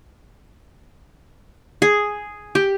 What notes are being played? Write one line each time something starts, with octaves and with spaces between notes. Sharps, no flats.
G#4
G4